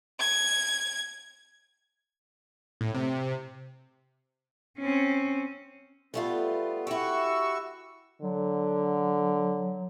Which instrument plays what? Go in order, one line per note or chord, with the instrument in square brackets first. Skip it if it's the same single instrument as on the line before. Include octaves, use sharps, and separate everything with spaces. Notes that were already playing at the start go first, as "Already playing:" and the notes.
[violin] G#6
[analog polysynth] A2
C3
[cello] C4 C#4
[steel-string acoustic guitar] G3 A3 F4 [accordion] B3
[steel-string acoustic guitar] E4 G4 [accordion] F#4 C#6 E6
[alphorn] D3 [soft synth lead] F#3